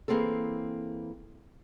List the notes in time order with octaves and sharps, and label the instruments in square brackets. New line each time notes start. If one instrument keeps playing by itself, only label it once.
[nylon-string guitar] E3 G3 A#3 C4 G#4 A4